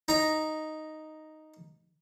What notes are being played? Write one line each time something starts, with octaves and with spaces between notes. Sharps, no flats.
D#4 A#5